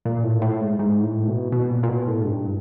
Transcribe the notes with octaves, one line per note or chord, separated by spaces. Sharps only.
A#2
A2
A2
G#2
G#2
A2
B2
B2
A#2
A#2
B2
A2
G#2
G2